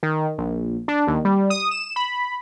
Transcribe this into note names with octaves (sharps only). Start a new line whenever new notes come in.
D#3
A#1
D4
D#2
G3
D#6
E7
B5